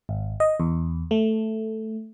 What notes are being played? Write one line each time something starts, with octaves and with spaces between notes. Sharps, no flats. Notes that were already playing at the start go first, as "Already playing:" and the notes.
G#1
D#5
E2
A3